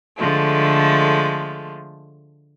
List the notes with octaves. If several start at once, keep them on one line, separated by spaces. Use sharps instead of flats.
D3 F3 G#3 A3